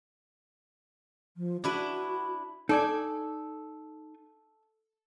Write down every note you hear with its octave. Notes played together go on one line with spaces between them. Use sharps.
F3
D4 E4 F#4 B4
D#4 A4 D5 G#5